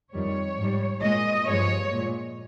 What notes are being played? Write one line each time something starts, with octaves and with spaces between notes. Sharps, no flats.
F2 D#3 G3 C#5
G#2 G3
A#2 G#3 D#5
G2 F3 G#3 C#5
A#2 G#3